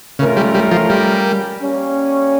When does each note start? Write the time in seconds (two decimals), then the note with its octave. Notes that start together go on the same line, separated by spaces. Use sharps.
0.19 C#3 A3 C#4 F4 A#4
0.36 G3
0.54 G3
0.71 F3
0.90 G3
1.60 G3 A#3 C#4